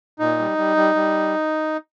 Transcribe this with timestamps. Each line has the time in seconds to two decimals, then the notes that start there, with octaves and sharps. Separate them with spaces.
0.19 A#2 D#4
0.39 G3
0.58 G3
0.77 G3
0.95 G3